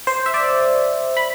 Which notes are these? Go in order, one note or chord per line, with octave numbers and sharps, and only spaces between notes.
C5
E5
D5
B5